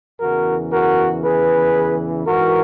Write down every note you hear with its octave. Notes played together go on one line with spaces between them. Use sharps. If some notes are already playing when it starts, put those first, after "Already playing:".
E2 C#3 E3 F#4 A#4
F#4 A#4
G#4 B4
G#2 E3 F#4 A#4